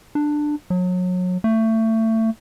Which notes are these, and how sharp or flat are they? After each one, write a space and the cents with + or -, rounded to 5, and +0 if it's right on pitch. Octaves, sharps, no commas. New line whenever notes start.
D4 +15
F#3 -30
A3 +25